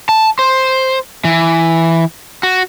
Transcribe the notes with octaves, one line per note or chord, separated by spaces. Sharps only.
A5
C5
E3
F#4